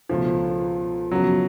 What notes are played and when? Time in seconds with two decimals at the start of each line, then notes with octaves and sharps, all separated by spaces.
0.09 C#2 B2 F3 A3
1.11 F#2 C#3 F3 F#3 B3